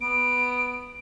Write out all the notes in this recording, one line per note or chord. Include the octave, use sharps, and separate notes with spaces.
B3 D7